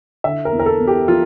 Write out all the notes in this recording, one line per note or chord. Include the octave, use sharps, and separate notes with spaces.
D3 E5
A#4
E2
A#4
A4
E2
G4
F3 F4